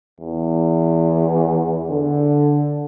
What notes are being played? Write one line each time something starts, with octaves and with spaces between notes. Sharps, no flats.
E2
D3